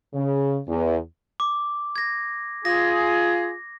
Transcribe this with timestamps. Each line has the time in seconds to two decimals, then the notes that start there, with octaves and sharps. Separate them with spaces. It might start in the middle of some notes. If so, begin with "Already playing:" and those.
0.13 C#3
0.68 E2
1.40 D6
1.96 G#6 A#6
2.65 F4 G#4 A#6